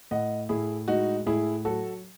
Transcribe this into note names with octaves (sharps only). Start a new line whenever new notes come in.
A2 D#5 F#5
A2 E4 G#4
G#3 D#4 F#4
A2 E4 G#4
F#3 F#4 A4